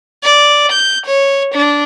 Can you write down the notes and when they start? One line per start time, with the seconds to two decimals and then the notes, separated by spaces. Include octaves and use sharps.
0.24 D5
0.72 G6
1.06 C#5
1.54 D4